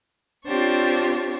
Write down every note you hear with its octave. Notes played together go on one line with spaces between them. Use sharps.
C4 D4 F4 G4 C5 C#5